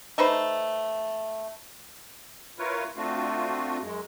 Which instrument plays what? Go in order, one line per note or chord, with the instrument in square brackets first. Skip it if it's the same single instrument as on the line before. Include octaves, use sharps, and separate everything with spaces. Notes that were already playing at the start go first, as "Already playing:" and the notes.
[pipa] A3 D#4 B4 C5
[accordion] E4 F4 A#4 B4 C#5
A3 C4 D4 F4 F#4
F#2 G#3